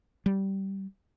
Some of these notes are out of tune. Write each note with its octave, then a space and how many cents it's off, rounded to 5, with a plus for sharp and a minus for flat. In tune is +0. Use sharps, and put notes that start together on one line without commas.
G3 -15